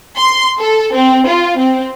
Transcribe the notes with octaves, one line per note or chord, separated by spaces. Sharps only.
C6
A4
C4
F4
C4